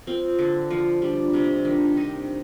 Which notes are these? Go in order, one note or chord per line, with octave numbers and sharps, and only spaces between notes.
C4 F4
D3
F3
G3 D4
C3
D4
D#3
C4 D#4